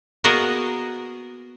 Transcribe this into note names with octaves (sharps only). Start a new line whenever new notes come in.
A#3 B3 F#4 G#4 A#4 D#5